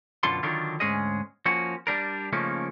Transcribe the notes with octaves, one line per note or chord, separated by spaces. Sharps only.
F#2 B2 D3 F4 A4 C6
D3 D#3 F#3 D4 D#4 F4
D2 G#2 G#3 C#4 G#4 D#5
F3 A#3 C#4 F#4
G3 D4 A#4
C#3 F3 A3 A#3 C#4 D#4